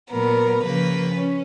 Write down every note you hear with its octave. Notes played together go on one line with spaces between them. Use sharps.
A#2 F#3 B3 A#4
C#3 F3 A#3 B4
C#4